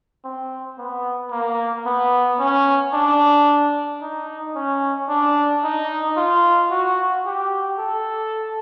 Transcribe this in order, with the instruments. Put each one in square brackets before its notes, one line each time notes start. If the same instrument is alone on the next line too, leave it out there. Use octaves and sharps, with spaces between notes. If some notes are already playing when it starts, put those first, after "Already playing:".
[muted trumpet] C4
B3
A#3
B3
C#4
D4
D#4
C#4
D4
D#4
F4
F#4
G4
A4